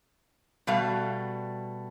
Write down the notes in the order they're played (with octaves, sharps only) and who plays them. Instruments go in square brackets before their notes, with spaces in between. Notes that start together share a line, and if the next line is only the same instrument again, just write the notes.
[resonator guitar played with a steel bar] B2 G3 A3 F5